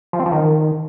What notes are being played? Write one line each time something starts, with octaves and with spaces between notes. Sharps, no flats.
F3
C4
F3
D#3